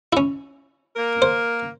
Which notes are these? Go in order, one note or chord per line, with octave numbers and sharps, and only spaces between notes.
C#4 E4
A#3 A#4
C5